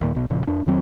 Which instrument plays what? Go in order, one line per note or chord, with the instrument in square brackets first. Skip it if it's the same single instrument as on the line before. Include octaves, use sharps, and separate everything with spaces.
[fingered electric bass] D#2 A#2
B1 B2
E1 A#2 C#3 F3
F2 D4
F2 D#3 F#3 C4